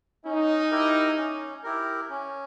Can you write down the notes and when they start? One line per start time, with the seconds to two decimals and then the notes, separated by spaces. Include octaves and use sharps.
0.25 C#4 D#4
0.71 E4 G4 A#4
1.17 C#4
1.63 E4 G4 A#4
2.09 C#4